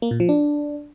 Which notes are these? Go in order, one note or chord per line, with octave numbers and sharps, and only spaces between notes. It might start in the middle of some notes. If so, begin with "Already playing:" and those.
A#3
A#2
F3
D4